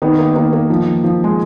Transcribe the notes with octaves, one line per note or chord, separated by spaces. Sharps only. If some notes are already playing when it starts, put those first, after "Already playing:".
D#3 B3
A#3
D#3 A#3
A#3
F3
F3
G#3